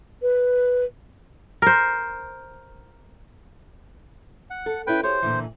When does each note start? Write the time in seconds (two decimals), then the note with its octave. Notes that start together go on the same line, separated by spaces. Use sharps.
0.22 B4
1.62 A#4 C5
4.50 F#5
4.66 A4
4.87 C#4 E4 B4 G5
5.03 G4 G#4 C5 C#5
5.22 A#2 D3 E3